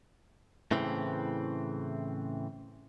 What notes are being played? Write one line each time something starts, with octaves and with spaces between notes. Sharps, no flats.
A2 C#3 E3 C4